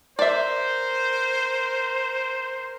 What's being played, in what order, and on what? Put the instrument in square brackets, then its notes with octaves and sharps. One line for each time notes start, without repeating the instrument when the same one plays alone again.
[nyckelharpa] A#4 [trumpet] C5 [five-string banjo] D5 E5